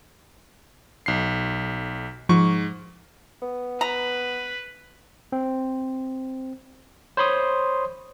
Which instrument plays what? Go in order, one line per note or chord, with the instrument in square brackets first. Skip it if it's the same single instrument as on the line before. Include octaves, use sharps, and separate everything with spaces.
[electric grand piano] B1 C7
[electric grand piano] G#2 C#6 [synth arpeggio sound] F3
[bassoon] B3
[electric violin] B4 [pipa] A#5
[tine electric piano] C4
C5 C#5 B5 C6 D#6